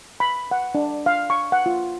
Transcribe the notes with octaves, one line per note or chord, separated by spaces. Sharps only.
B5
F#5
D4
F5
C#6
F#5
F4